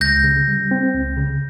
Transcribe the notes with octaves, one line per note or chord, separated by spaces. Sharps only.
C#2 G6 A#6
C#3
G3
C4
C#2
C#3